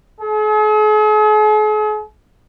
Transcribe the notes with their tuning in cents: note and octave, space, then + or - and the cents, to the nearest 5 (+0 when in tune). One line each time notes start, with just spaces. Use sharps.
G#4 +45